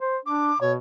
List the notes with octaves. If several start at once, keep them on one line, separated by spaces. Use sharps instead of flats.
C5
D4 D6
B2 C#5